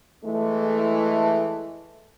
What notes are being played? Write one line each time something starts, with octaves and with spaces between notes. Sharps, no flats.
E3 G#3 A3